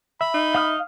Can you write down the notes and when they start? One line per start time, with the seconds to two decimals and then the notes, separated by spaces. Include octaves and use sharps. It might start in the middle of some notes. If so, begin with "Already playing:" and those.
0.21 E5 B5
0.34 D#4
0.55 F5 D#6 F6